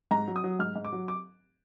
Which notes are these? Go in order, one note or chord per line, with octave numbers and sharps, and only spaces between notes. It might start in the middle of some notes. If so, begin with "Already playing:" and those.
G#2 A#5
F#3
D#6
F#3
G#2 F6
G#2
D6
F#3
D6